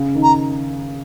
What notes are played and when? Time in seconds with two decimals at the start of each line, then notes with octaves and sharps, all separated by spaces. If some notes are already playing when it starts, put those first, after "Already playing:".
Already playing: C#3
0.15 D#3
0.23 A#5